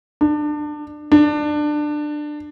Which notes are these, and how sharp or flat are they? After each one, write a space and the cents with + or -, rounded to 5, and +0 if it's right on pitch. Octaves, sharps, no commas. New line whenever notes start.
D4 +25
D4 +20